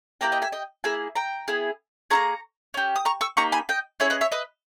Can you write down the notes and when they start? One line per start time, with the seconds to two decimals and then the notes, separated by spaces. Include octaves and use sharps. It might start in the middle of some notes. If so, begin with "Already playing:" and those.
0.21 A#3 E4 G4 G5 A#5
0.32 D#5 G5
0.42 E5 G#5
0.52 D#5 G5
0.84 A#3 E4 G#4 E5 G#5
1.15 G5 A#5
1.48 B3 E4 G#4
2.10 A#3 E4 G#4 A#5 C#6
2.74 C#4 G4
2.96 D#6
3.05 A#5 C#6
3.21 C#6 E6
3.37 A#3 D#4 G4 A#5 C#6
3.52 G#5 B5
3.69 D#5 G5
4.00 C#4 E4 G#4 C#5 E5
4.10 B4 D#5
4.21 C#5 E5
4.32 B4 D#5